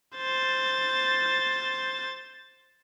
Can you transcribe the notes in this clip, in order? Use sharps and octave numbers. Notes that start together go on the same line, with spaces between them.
C5 A6